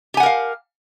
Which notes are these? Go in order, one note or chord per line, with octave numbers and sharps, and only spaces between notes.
G4 A#4 F5 F#5 G#5